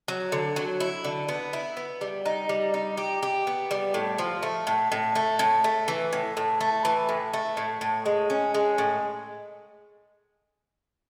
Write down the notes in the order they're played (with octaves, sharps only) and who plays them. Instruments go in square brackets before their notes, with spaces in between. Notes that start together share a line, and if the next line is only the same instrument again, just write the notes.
[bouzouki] F#3
D3
F#3
E4
D3
B3
E4
B3
G3
D#4
G3
D#4
G4
G4
B3
G3
A2
F3
A3
A2
A2
A3
A2
A3
E3
A2
A2
A3
E3
A2
A3
A2
A2
G#3
C#4
G#3
A2